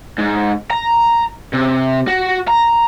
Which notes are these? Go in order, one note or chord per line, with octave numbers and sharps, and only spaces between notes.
G#2
A#5
C3
F#4
A#5